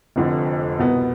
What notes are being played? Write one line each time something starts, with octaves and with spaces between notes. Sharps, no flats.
F1 F2 D3 F3
C2 B2 B3